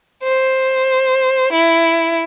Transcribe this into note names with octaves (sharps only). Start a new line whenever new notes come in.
C5
E4